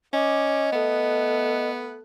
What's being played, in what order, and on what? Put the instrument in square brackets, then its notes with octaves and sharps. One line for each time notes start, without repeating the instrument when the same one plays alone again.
[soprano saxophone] C#4 [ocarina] D#5 [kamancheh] D6
[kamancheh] A3 F#6 [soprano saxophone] B3